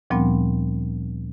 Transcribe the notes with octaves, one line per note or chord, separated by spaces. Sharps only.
D2 A#2 F3 G3 B3 C4